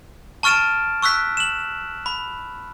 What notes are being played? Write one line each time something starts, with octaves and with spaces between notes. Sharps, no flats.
A5 C#6 F6 A6 D7 E7
C#6 E6 F#6 B6
E7 F#7
B5